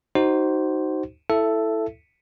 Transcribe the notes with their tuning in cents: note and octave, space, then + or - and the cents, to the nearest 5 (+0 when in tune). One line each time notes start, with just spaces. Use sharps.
D#4 +0 F#4 +30 C5 +0
E4 +0 A4 +0 E5 +20